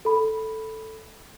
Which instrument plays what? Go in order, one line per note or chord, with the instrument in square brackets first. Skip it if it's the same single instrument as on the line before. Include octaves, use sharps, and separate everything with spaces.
[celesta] A4 B5